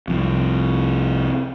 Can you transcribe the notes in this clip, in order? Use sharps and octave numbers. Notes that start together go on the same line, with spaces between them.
C2 F2